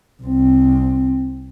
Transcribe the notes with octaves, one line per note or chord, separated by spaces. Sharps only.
C2 C4